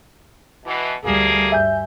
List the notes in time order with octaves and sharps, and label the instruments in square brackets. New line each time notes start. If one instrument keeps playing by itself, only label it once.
[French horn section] B2 E3
[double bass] D2 G3 [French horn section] A3 A#3 G#4
[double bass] G2 [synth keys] E5 G#5 G6